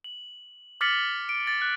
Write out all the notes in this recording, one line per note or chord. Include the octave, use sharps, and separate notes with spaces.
F#7
D6 F6 A6 B6 C#7 F#7
D7
A6
F#6